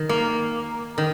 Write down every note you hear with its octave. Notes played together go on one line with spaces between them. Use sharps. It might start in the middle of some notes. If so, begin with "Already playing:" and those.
Already playing: D#3
A#3
D#3